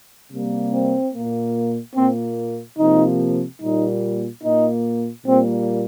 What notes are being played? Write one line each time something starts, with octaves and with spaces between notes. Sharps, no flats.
C3 G3 A#3
C4
A#2 A#3
A#2 A#3 C4
C3 F3 A#3 D#4
A#2 G3 A#3 D#4
A#2 A#3 D#4
A#2 G3 A#3 C4